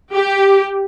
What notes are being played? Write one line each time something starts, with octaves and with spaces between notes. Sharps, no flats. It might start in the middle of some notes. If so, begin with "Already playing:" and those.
G4